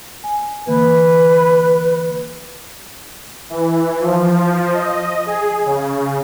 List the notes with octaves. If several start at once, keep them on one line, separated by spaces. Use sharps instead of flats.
G#5
D3 E3 A#3 B4
E3
F3
D#5
G#4
C#3